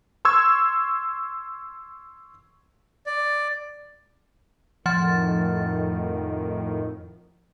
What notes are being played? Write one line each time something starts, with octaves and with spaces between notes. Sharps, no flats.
C6 C#6 E6 G#6
D5
F2 A2 D#3 F3 F#5 A6